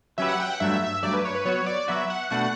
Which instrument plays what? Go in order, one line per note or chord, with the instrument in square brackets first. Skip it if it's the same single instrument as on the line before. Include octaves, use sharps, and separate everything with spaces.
[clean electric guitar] F#3 C#4 G4 B4 [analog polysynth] E5
[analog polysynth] F#5
G5
F#5
[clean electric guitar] G2 F#3 A3 [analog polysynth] E5
[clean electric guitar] G2 F#3 A3 [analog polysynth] D5
[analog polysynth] B4
C#5
B4
[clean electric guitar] F#3 B3 F#4 [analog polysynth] C#5
[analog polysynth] D5
[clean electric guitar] F#3 B3 F#4 [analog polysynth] E5
[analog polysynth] F#5
[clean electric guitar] B2 A3 D4 F#4 [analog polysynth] F#5